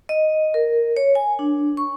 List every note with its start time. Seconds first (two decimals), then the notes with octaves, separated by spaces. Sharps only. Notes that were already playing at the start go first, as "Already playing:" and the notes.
0.09 D#5
0.54 A#4
0.97 C#5
1.15 G#5
1.39 D4
1.77 C#6